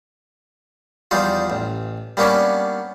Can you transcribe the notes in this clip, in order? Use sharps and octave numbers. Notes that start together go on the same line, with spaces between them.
E2 F3 G3 D#4 F4
A1
G3 A#3 B3 C#4 D4